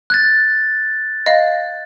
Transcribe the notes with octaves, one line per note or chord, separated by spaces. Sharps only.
F#6 G#6 A6
D#5 F5